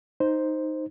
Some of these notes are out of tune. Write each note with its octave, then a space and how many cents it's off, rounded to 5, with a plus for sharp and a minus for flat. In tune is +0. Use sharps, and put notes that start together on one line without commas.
D#4 +0 C5 +0